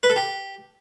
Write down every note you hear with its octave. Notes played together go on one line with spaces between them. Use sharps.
B4
A4
G4